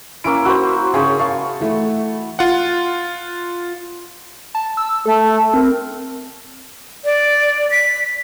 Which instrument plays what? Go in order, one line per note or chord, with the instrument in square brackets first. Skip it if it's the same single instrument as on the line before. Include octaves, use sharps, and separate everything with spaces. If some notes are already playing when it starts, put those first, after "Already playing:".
[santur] A#3 C#4 E4 [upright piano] D7
[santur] F#4 C5 [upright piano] B5 E6
[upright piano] C#3 [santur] G#4 C#5
[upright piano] F5 C#6 [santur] A5
[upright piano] E3 A3
[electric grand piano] F4 F#5
[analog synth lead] A5
E6
[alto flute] A3 [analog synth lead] A4
[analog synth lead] C4 [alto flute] A#4
[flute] D5
B6